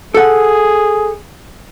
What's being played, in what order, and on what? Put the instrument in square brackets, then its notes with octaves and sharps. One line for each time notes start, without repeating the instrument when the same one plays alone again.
[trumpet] G#4 [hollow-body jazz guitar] A4 F#5